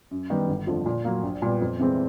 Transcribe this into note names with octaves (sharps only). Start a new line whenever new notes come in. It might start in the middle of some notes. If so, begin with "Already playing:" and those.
F#2
D#3 G3 B3
G1
F2 D3 F3
A#2
F#3 A#3
A#1
A#2 G3 B3
F2
C3 E3 G#3 C4